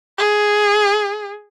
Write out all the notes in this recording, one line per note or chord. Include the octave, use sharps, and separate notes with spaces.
G#4